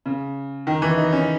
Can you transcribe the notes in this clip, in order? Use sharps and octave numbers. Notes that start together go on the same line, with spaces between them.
C#3
D#3
E3
D#4
C#4